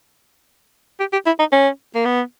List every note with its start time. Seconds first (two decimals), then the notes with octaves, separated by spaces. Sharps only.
1.00 G4
1.12 G4
1.26 E4
1.39 D#4
1.52 C#4
1.95 A#3
2.05 B3